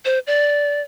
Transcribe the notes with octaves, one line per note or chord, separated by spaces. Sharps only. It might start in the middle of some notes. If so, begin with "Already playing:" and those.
C5
D5